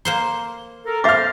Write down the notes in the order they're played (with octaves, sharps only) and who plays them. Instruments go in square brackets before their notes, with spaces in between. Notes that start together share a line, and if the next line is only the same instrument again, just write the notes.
[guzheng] A#3 C5 C6
[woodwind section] A4 A#4
[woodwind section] C5 F5 [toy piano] E5 D6 [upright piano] F6 A6